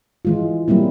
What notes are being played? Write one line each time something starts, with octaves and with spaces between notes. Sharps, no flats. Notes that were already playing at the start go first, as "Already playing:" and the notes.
E3 G#3 F4
F#3 G3 A#3 C4 E4